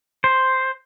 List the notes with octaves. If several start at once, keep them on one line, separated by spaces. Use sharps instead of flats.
C5